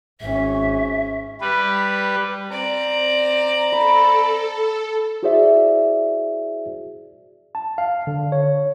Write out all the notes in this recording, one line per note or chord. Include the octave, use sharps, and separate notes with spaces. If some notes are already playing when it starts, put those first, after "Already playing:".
G#1 C#4 E5
G3 B4
C4 D5 A#5
A4 B5
E4 F#4 G#4 C5 D5 E5
A5
F5
D3
C#5